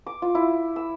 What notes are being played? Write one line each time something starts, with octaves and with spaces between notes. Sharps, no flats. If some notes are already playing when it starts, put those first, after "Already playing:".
D6
F4
E4
E6